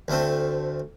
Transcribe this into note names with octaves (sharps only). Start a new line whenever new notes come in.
D2 A3 C4